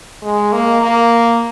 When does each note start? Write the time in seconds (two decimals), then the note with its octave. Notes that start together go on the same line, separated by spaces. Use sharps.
0.23 G#3
0.52 A#3
0.82 A#3